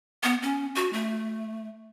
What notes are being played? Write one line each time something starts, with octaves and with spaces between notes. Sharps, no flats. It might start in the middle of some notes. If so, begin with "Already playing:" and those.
B3
C#4
F#4
A3